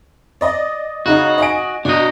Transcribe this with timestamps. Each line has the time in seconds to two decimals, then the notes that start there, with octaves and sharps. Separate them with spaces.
0.41 D5 D#5
1.06 C#3 D#4 F#4
1.38 D#5 G#5 D7
1.85 B2 D4 D#5